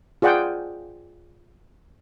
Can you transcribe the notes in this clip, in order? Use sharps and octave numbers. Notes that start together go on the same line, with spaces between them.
F4 G#4 D5 F#5 G5